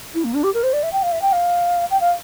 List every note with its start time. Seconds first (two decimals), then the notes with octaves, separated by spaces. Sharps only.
0.15 E4
0.24 A#3
0.34 D4
0.43 G4
0.54 A#4
0.63 C5
0.73 D5
0.83 E5
0.93 G5
1.03 F5
1.12 E5
1.22 G5
1.32 F5
1.90 G5
2.00 F5